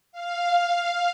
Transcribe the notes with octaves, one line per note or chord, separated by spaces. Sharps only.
F5